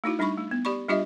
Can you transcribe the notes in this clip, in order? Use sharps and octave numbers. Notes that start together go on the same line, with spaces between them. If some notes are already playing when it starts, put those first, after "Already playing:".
A3 D#4 E4 F#4
G3 D4 D#4 B5 C#6
A3
B3
G4 D5 B5 C#6
G3 D4 F4 G4 D#5 E5